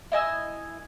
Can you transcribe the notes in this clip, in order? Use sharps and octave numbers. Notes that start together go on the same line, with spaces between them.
E4 D#5 G#5 E6